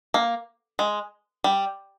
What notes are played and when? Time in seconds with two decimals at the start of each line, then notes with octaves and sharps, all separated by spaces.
0.14 A#3
0.79 G#3
1.44 G3